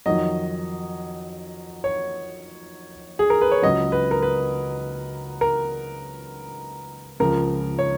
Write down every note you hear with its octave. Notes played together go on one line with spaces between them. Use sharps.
F2 D#3 F#3 D#5
C#5
G#4
A#4
B4
C#5
C#2 C#3 F#3 D#5
B4
A#4
B4
A#4
C#2 C#3 F3 A#4
C#5